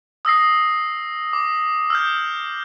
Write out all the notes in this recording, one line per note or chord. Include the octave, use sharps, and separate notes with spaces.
D#6 E6 A#6 C7
D6
E6 F6 G6